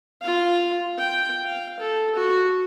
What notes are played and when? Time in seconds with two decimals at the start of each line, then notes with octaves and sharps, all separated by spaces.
0.22 F4 F5
0.98 G5
1.45 F5
1.80 A4
2.16 F#4